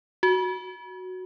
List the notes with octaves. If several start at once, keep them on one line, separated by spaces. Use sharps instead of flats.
F#4